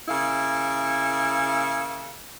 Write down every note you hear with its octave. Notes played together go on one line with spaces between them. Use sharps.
C#3 A#3 E4